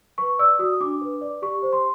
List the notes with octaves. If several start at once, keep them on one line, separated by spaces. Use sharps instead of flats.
B4 C#6
D5 E6
F#4 D#6
D4 D6
B4
D5
G4 C#6
C5
C6